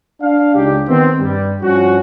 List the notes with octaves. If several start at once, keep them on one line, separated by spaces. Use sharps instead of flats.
D4 F5
C#2 C#3 D4 D#4 G4
D#3 B3 C4
G2 G3
G2 F3 G3 C#4 F#4